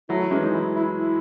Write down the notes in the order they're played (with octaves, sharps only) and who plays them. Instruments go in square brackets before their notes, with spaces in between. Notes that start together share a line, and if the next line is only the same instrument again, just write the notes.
[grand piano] F#3 A3 [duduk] E4
[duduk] E4
[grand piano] E3 G#3 [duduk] C#4
[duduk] D#4
E4
E4
E4